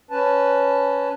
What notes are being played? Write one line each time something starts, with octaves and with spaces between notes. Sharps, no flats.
C#4 B4 A5